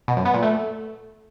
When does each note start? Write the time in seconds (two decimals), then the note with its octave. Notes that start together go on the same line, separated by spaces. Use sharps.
0.08 B2
0.17 F#2
0.25 B3
0.34 A#2
0.43 A3